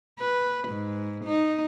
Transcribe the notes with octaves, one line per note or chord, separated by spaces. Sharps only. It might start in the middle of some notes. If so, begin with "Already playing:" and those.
B4
G#2
D#4